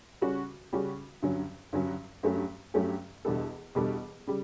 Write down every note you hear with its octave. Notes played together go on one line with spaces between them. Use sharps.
C#3 G3 C#4 F#4
C#3 G3 C#4 F#4
G2 D3 F#3 C#4
G2 D3 F#3 C#4
G2 F#3 A3 C#4 G4
G2 F#3 A3 C#4 G4
E2 B2 G3 D4 A4
E2 B2 G3 D4 A4
C#3 G3